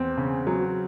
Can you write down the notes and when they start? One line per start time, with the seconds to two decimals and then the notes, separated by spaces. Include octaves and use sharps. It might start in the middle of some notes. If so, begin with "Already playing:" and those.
Already playing: E2 C4
0.17 C#3
0.47 F#3